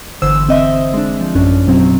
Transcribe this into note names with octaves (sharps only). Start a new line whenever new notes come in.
G1 D3 E3 C5 E6
C4 D#5 E5
G#3 D4
F3
A1 F#2 C#4 D4
B2 F#3 C4